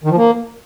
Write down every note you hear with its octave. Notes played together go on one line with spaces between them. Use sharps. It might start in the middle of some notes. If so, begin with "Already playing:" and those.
D#3
F3
A#3